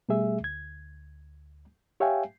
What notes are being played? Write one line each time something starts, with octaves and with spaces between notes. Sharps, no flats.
B2 G3 A3 G#4 E5
D2 G#6
G4 C#5 E5 F5 G5 G#5